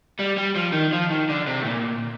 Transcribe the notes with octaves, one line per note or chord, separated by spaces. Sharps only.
G3
G3
F3
D#3
F3
D#3
D3
C3
A2
A#2